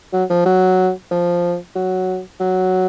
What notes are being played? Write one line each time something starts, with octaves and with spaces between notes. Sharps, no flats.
F#3
F3
F#3
F3
F#3
F#3